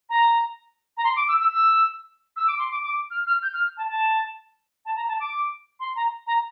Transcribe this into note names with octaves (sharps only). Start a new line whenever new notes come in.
A#5
A#5
C6
D6
E6
E6
E6
E6
D6
C6
D6
D6
F6
F6
G6
F6
A5
A5
A5
A#5
A5
D6
C6
A#5
A#5